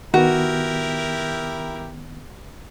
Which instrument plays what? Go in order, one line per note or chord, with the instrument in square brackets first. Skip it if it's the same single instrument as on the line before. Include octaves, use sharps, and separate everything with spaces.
[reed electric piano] D#3 B3 [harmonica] E4 G4 A#4 [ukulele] F#4